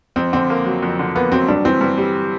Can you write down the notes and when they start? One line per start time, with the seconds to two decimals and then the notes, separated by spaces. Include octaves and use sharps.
0.16 F2 C4
0.33 D3 C4
0.50 A#3
0.66 F#3
0.82 F2
0.99 D3
1.15 A#3 B3
1.32 F#3 C4
1.48 G2 D4
1.65 E3 C4
1.81 G2
1.98 G3